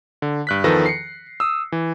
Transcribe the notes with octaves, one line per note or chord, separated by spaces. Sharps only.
D3
G2 F#6 B6
E2 D#3 F3 A4 B4 A#6
C7 C#7
D#6 E6
E3